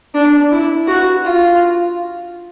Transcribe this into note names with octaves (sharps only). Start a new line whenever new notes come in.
D4
E4
F#4
F4